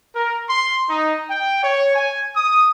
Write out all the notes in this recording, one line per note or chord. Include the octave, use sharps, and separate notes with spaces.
A#4
C6
D#4
G5
C#5
G#5
D#6